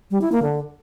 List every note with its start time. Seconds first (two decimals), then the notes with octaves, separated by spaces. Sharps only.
0.11 G3
0.21 E4
0.32 A#3
0.43 D3